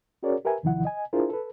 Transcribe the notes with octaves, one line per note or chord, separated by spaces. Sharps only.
C#4 F#4 G#4 A#4 C#5 D5
G4 A#4 B4 E5 G#5
D#2 C3 D#3 F3 E4 F#5
D#5 G#5
D4 E4 F4 G#4 A#4 C5
A4 B4